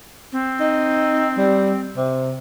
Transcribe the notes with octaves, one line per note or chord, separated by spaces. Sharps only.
C4
D#4
G3
C3